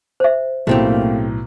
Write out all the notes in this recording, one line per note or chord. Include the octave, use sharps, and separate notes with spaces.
C5 E5
B1 A2 A3 A#3 C4 G4